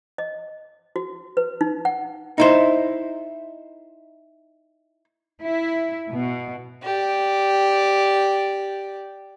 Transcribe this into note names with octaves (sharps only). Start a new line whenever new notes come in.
D#5
F#4
B4
D#4
F#5
D#4 E4 C5
E4
B2
G4 D5